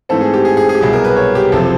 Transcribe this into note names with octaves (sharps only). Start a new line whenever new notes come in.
G#2 E3 A3 C4 A4
G#4
G4
G#4
G#4
G#4
G4
C2 B2 F#3 G#4
A#4
B4
C#5
G4
F#1 C3 F3 A4